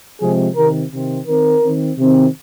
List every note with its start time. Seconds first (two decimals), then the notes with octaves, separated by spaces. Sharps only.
0.21 C3 F3 G#3 C4 G#4
0.56 C3 D#3 C4 A#4
0.91 C3 D#3 C4
1.27 D#3 C4 A#4
1.62 D#3 C4
1.98 C3 D#3 C4